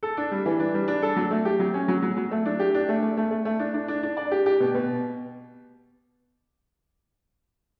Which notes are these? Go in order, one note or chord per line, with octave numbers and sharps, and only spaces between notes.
A4
D4
G3
E3
D4
G3
D4
A4
F#3
A3
G4
F#3
C#4
F#3
F#3
F#3
A3
D4
G4
D4
A3
A3
A3
A3
A3
D4
D4
D4
D4
D5
G4
G4
B2
B2